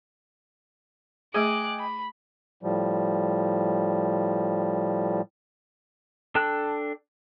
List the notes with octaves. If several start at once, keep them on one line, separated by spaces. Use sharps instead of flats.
A3 G#4 D#5 G5 G#5 D6 F#6
B5
A2 F3 G3
D4 A4 G5 A5 F#6